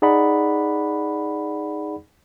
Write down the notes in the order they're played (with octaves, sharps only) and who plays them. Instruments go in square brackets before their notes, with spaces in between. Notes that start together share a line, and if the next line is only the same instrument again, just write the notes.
[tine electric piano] D#4 G#4 D5 F#5 B5